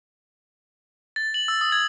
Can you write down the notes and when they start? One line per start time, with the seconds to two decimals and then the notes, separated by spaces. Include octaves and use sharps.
1.16 A6
1.34 F#7
1.48 E6
1.61 D#6
1.72 G#6